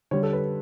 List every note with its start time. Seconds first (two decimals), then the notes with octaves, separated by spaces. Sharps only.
0.11 D3 G3 C#5
0.23 A4
0.33 B4